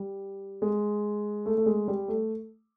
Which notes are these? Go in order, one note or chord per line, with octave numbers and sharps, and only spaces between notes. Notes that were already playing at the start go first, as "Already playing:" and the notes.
Already playing: G3
G#3
A3
A3
G#3
G3
A3